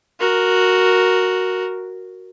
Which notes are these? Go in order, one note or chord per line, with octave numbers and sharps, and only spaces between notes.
F#4 A#4